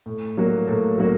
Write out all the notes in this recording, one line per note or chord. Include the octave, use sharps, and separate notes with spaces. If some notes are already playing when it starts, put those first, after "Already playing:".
A2
F#3 A#3 F#4
A2
F#3 A#3 F#4